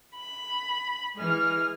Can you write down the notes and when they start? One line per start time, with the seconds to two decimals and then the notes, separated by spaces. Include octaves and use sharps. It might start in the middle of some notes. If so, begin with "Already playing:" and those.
0.15 B5
1.17 E3 G#3 G#4 F6